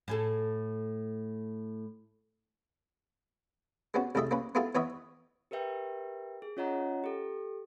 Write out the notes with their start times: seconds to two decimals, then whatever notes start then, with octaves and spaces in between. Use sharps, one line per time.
0.08 A2 G#4 A4
3.94 G#3 B3 C#4 F#4
4.15 C2 A2 G#3 A4 D#5 E5
4.31 A#3 C#4 B4
4.55 B3 E4 F4 G#4 A4
4.75 E3 B3 B4 C#5 D#5 E5
5.51 G4 A#4 B4 E5 G5
6.42 G#4
6.57 C#4 F4 C#5 D#5 F#5 A#5
7.04 G4 A4